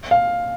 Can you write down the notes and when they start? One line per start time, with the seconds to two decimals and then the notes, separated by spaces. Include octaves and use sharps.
0.11 F5